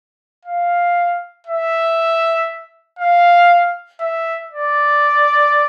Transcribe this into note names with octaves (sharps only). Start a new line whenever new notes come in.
F5
E5
F5
E5
D5